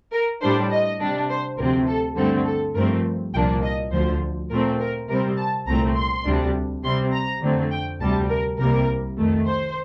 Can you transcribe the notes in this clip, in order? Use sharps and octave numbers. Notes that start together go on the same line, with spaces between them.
A#4
A2 G3 D4 C5
D#5
C3 G3 D4
C5
D2 C3 F3 C4 A#4
A4
G2 D3 A3 C4 A4
A4
G2 F3 A3 C4 A#4
C2 A#2 F3 A#3 D4 G5
D#5
D2 D3 F3 C5
A#2 A3 C4 A#4
A#4
C3 G3 C4 A#4
A5
C2 A#2 A3 C4 A#5
C6
D2 C3 G3 D4
C3 G3 C4 C6
A#5
F2 D3 A3 C4
G5
D2 C3 G3 A5
A#4
C2 C3 G3 A#3 A#4
F2 D#3 A3
C5